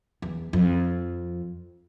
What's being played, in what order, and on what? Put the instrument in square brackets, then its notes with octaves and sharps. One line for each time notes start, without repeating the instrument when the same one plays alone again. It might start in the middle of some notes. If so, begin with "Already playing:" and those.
[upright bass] E2
F2